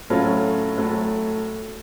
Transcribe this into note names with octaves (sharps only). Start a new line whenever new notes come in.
A2 F#3 A3 C#4 F4
A2 F#3 A3